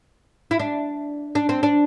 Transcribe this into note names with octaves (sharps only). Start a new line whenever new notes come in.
E4
D4
D4
C4
D4